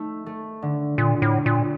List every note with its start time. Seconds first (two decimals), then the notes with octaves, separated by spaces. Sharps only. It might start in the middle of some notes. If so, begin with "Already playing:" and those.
Already playing: A3 D#4
0.26 A3
0.62 D3
0.98 A#2 D3
1.22 A2
1.34 A3
1.46 A#2